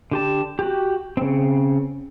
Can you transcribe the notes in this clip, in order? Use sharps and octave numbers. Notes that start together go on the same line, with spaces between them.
D3 G4 A5
F#4 G4
C#3 C4